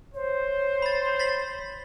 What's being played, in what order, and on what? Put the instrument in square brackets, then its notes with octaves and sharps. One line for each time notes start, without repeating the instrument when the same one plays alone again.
[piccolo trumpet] C5 [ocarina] C#5
[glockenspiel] B5 A6
A6 B6 F#7